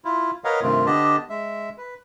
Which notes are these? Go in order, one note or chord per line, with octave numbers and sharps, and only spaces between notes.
E4 F4
A#4 B4 C#5 D#5 F5 F#5
G2 C3 D#3 A3 C4 F4
D3 B3 D4 G4 D#5 A5
G#3 E5
B4